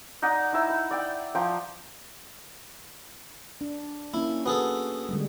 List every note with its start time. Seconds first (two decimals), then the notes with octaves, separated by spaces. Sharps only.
0.22 D#4 D5 D#5 F#5
0.53 D#4 E4 E6
0.70 B5
0.91 D5 G5
1.35 F3 G5 A#5
3.61 D4
4.14 A#3 C#4 E4
4.46 B3 F#4 G#4 A4
5.09 D3 G3 G#3